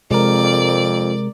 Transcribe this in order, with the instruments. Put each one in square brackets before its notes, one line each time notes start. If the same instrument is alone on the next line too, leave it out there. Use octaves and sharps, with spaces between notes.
[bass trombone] F2 [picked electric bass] C3 [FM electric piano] G#3 A#4 [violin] D5